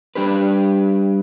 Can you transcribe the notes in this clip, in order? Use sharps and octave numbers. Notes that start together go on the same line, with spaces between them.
G3 D4 G4 B4